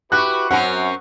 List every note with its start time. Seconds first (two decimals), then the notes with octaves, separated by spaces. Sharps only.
0.12 E4 F#4 G4 B4 F#6
0.51 F#2 C4 C#4 A#4 F#5